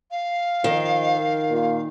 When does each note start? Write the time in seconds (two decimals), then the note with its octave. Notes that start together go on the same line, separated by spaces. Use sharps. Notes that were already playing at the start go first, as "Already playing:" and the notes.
0.11 F5
0.64 D#3 F3 D#5
1.14 A#4
1.50 A#2